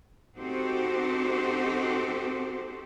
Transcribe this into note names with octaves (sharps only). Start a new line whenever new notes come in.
C4 D#4 F#4 G4 A4 C5